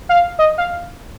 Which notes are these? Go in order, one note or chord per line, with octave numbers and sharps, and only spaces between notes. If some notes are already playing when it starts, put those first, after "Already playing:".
F5
D#5
F5